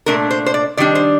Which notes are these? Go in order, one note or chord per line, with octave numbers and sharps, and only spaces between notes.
A#2 A3 D4 A#4
C5
C5
D5
D#3 G3 D4 D5
C5